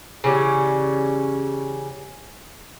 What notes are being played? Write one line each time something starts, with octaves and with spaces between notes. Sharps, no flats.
C#3 E3 G3 C#4